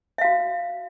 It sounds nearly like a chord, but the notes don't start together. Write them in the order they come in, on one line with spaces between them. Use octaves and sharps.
E5 F5 F#4